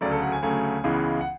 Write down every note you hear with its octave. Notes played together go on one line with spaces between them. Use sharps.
D2 C#3 F#3 A3 D5
A4
F#5
G#5
D2 C#3 F#3 A3 G#5
C#2 C#3 E3 G#3 B3
F#5